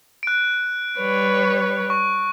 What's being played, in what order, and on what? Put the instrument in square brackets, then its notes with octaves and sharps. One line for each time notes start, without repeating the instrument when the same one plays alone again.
[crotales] F#6 D7
[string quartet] G3 B4 C#5
[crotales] C#6